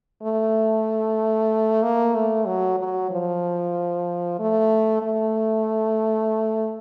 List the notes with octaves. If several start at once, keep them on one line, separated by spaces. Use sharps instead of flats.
A3
A#3
A3
F#3
F#3
F3
A3
A3